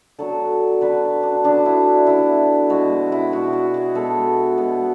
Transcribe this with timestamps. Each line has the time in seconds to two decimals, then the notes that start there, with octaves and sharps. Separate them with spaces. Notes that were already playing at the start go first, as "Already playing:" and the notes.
0.19 D3 F#3 B3 A4
0.81 D3 F#3 B3 B4
1.23 D4
1.44 D3 F#3 B3 D4
1.66 E4
2.07 D3 F#3 B3 E4
2.70 B2 G#3 B3 F#4
3.12 E4
3.32 B2 G#3 B3 F#4
3.53 F#4
3.74 G#4
3.95 B2 G#3 B3 A4
4.58 B2 G#3 B3